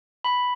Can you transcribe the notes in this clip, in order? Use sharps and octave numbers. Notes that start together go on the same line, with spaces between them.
B5